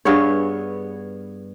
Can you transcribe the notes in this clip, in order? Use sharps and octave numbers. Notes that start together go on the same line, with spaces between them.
G2 B3 G#4 C#5